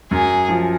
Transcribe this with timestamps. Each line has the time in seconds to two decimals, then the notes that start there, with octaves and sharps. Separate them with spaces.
0.11 F#2 G#4
0.49 F3